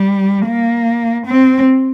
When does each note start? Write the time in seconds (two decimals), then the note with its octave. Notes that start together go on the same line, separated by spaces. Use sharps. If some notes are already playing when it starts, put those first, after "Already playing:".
Already playing: G3
0.47 A#3
1.26 C4